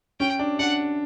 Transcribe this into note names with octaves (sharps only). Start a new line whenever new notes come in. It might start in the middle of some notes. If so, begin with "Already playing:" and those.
C#4 G5
D4
D4 F#5